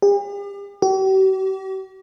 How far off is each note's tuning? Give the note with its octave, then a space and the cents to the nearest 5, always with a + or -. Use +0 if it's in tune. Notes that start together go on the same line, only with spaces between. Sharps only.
G4 +45
G4 -45